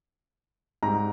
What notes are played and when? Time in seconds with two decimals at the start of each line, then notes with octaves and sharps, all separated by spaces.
0.83 G#2 G3 A#5